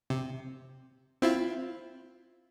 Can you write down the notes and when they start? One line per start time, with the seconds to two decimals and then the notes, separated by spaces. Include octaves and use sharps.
0.10 C3
1.22 C4 E4 F4